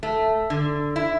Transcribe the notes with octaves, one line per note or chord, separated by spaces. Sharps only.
A3
D3
E4